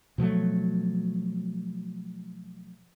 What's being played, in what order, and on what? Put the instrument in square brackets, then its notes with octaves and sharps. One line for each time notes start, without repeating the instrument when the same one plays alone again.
[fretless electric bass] B2 F3 F#3 A3